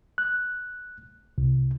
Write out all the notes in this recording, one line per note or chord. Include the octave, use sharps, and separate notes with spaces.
F#6
C2